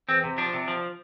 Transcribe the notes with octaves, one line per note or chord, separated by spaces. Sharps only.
E2 C4
C3
F3 D4
C3
F3